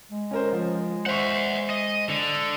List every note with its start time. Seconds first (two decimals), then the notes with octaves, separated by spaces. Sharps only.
0.12 G#3
0.31 C#4 A#4 C5
0.53 F3
1.06 C5 E5 F#5 C#6
1.70 D#5
2.09 D3